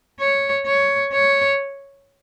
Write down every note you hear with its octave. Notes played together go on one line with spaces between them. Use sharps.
C#5
C#5
C#5